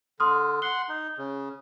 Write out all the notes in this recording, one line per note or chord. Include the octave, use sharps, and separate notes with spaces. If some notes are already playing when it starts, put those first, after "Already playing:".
D3 C6 D#6 F6
F#5 C6 G7
D#4
C#3